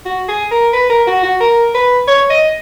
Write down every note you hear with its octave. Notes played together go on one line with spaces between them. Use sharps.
F#4
G#4
A#4
B4
A#4
F#4
F#4
A#4
B4
C#5
D#5